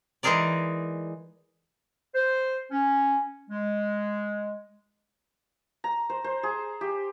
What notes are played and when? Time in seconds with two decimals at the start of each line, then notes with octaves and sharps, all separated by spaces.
0.23 E3 G#3 D#4 G#4 A#4 D5
2.15 C5
2.71 C#4
3.50 G#3
5.84 A#5
6.10 C5
6.24 C5
6.43 G#4
6.81 G4